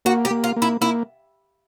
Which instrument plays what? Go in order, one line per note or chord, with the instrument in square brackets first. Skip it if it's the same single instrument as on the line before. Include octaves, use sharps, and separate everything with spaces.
[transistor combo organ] A#3 [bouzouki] F#4
[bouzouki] G4
[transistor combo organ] A#3
[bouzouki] F4
[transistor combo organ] A#3
[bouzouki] E4
[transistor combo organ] A#3 [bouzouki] E4